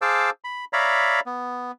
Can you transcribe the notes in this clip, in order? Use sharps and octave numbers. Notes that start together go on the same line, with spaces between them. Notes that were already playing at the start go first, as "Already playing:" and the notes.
G#4 C5 F5 A5 D6 E6
B5
C#5 D5 E5 F5 A#5 B5
B3